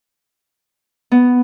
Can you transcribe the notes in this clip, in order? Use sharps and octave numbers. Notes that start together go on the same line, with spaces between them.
B3